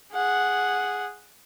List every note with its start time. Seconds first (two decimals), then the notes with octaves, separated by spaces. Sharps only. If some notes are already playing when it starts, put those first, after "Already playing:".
0.13 G#4 F#5